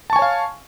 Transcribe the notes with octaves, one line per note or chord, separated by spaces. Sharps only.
C#5 F5 G#5 A5 C#6